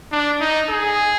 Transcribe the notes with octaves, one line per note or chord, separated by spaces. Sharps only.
D4
D#4
G#4